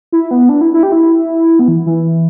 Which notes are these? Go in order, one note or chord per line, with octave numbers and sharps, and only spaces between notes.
E4
B3
D4
E4
E4
G4
E4
B3
E3
E3